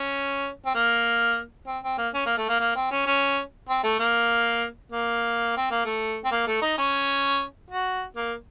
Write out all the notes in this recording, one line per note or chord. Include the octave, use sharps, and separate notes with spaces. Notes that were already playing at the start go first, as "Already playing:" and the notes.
Already playing: C#4
C4
A#3
C4
C4
A#3
C#4
A#3
A3
A#3
A#3
C4
C#4
C#4
C4
A3
A#3
A#3
C4
A#3
A3
C4
A#3
A3
D#4
C#4
F#4
A#3